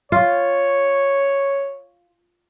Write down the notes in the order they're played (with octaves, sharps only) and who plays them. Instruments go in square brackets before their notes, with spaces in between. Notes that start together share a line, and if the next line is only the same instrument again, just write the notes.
[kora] F4 [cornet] C#5